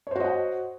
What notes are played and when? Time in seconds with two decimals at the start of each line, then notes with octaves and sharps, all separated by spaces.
0.07 C#5
0.11 C5
0.16 F#4
0.20 D#5
0.24 F#5